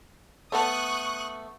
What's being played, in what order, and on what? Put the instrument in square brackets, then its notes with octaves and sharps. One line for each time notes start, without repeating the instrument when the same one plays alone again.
[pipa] A3 B3 A5 [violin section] C#6 D#6 F#6